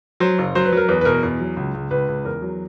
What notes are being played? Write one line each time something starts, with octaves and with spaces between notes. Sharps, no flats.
F#3 C5
F#1
F#3 C5
B4
F#3 A#4
E2 B4
B4
B2 A#4
E2
F#3
C#2
C#2
C#2 B4
C#2
E2 A#4
F#3